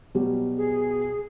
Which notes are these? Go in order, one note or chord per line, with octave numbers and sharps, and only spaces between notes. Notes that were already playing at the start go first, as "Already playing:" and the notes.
B2 F#3 G3
G#4